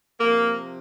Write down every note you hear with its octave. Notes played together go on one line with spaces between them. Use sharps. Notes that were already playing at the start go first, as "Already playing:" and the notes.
C3 F3 A#3